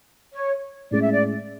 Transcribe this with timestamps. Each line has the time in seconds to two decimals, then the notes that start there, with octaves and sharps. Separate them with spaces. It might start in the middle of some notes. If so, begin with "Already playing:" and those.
0.34 C#5
0.91 A2 G#3 C#4 G#4 D5
1.02 E5
1.12 D5